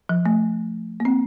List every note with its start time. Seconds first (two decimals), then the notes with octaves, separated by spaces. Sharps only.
0.09 F3
0.26 A3
1.00 A#3
1.05 C4